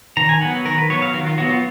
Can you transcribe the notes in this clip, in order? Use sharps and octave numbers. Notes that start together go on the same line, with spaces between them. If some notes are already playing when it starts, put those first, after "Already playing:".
D#3 A#5
G#5
F#3 B3 F#5
D#3 A#4
B4
F#3 B3 C#5
F5
D#3 F#4
F4
F#3 B3 F#4
F4